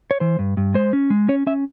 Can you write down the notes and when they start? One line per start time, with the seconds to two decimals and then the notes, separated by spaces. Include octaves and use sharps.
0.11 C#5
0.20 E3 C5
0.39 G2
0.57 G2
0.74 G#3 C5
0.93 C#4
1.10 G#3
1.29 C#4 C#5
1.47 C#4 E5